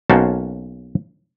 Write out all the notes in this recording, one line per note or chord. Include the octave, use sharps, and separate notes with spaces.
B1 A#3 C#4 F#4 C5 A5